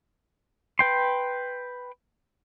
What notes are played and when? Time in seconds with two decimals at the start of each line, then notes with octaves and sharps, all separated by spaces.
0.79 B4 G5 C6